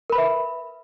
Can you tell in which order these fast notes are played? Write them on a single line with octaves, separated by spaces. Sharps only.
A#4 B5 B4 E5